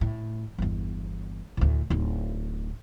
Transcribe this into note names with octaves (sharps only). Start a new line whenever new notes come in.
A2
G1 E2
D2 A2
D1 D#4